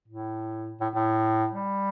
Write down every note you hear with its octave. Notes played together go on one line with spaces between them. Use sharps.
A2
A2
A2
G3